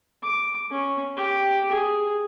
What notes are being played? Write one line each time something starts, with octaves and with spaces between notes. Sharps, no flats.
D6
C#4
G4
G#4